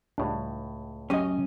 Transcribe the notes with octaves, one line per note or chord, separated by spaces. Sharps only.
C#2 A2 G3 D4
F#2 C#4 G4 D#5